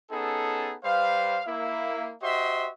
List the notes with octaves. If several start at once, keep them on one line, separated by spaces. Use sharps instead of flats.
B3 C#4 D#4 G#4 A4
G3 B4 C5 F5
A#3 E4 E5
F#4 G4 C5 D#5 E5 C6